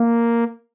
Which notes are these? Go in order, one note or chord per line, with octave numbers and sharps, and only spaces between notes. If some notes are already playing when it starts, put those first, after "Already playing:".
Already playing: A#3